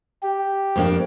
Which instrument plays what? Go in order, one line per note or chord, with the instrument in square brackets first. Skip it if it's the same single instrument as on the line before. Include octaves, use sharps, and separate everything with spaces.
[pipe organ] G4
[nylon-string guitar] F2 A#3 D4